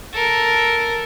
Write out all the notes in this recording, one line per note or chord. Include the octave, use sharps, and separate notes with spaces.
A4 A#4